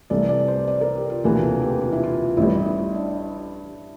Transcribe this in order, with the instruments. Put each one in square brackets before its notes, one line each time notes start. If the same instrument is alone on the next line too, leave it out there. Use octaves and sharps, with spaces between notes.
[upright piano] C2 C3 E3 A3 [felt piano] D5
[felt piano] D5
C5
D5
A#4
G4
F4
[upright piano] E1 D2 C3 E3 A#3 [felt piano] F4
[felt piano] A4
G4
F4
E4
F4
[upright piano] A1 A2 G3 [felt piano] E4
[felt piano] E4
D4